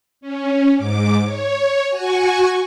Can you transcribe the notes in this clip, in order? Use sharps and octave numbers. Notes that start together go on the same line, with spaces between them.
C#4
G#2 D6
C#5
F#4 G#5 C#6